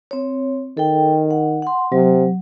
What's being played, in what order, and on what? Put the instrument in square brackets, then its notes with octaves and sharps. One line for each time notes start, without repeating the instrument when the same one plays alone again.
[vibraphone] C4 C#5
[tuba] D#3 [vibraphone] A4 G5
[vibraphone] F#5
F#5 C6
[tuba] C3 [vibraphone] F#3